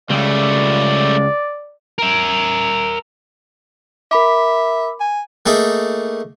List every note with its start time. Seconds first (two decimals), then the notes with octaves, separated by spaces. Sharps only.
0.10 C#2 G3 A3 D5
1.98 A#4 E5
4.11 A#4 E5 B5 D6
5.00 G#5
5.46 A3 A#3 D#4 G#4